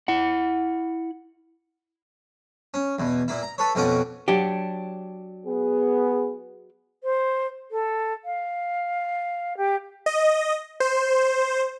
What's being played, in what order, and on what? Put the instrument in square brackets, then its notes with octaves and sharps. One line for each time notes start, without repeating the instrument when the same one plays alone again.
[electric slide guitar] E4 F#5
[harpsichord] C#4
E2 B2
A#2 A#3 E4
A#5
A4 B4 C#5
F2 B2 F3 C#4 F#5 D6
[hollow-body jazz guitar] F#3 D4 G4
[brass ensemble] B3 G#4
[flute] C5
A4
F5
G4
[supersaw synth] D#5
C5